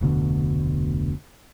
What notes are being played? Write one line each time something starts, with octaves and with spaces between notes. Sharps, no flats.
F1 D2 B2 D3